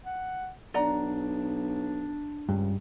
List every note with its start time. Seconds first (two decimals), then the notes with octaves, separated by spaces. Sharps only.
0.05 F#5
0.74 B1 D4 D5 F#5 A#5
2.49 C#2 G2